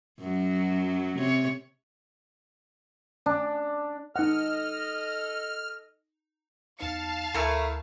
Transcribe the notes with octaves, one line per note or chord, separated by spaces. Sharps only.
F#2 F#3
C3 C#5
D4
D#4 A4 D#5 F#5 F6
E2 D#4 F5 A5 C#7
D2 A3 E4 A#4 C#6